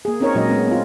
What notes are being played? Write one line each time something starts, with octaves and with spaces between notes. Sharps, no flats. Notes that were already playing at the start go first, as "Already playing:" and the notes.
A#3 G#4
C4 C#4 D#4 A#4 C#5
A#2 F#3 G#3 C#4 C#5 D#5
G#3 B3 C#4
C4 F4